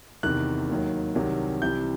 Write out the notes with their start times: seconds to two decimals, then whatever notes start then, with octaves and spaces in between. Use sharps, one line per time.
0.23 E2 C3 D#3 F#6
0.69 D#2 D#3 F#3
1.15 C2 C3 D#3 F#3
1.62 C2 C3 E3 G6